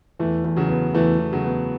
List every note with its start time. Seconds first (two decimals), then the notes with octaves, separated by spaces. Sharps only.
0.20 E2 E3 A3
0.44 E2
0.57 C#3 F#3
0.69 B3
0.94 E2 E3 A3
1.20 E2
1.33 C#3 F#3
1.45 B3